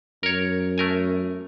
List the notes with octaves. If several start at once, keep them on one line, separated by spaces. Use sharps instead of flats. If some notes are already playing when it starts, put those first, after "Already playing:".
F#2 A#4 C#5
A3 A#4 G#5